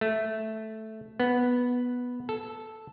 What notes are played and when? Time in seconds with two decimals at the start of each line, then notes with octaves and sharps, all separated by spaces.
0.01 A3
1.20 B3
2.29 A4